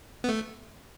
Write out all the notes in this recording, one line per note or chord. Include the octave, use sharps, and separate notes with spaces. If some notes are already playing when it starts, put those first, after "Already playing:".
B3
A3